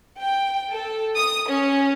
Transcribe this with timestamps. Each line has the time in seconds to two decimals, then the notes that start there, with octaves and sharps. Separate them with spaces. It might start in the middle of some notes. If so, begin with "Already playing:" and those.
0.19 G5
0.70 A4
1.16 D#6
1.48 C#4